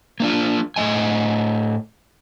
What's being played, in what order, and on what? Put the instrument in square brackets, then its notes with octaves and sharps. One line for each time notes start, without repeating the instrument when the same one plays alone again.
[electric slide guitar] A#3 D4 F4
A2 D#4 D#5 G#5